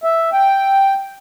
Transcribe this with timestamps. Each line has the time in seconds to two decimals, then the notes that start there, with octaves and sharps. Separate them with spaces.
0.04 E5
0.33 G5